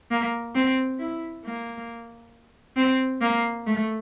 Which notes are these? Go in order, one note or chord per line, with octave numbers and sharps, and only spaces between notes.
A#3
C4
E4
A#3
C4
A#3
A3